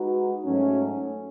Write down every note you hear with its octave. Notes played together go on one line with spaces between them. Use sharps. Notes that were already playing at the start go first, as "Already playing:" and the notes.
Already playing: G#3 D#4 F#4 B4
G#2 F#3 A3 C#4